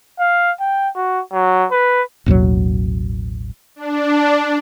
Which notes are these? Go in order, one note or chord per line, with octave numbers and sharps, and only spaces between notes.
F5
G5
F#4
F#3
B4
A1 D#2 B2 F#3
D4